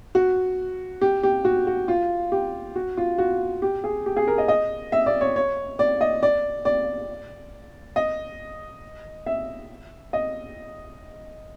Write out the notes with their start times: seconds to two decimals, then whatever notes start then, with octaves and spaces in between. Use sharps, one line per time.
0.15 F#4
1.01 G4
1.23 G4
1.45 F#4
1.67 F#4
1.88 F4
2.32 G4
2.76 F#4
2.97 F4
3.18 F#4
3.62 G4
3.84 G#4
4.06 G4
4.16 G#4
4.27 A#4
4.38 D#5
4.48 D#5
4.92 E5
5.06 D5
5.21 C#5
5.36 C#5
5.79 D5
6.01 D#5
6.23 D5
6.65 D5
7.96 D#5
9.26 E5
10.13 D#5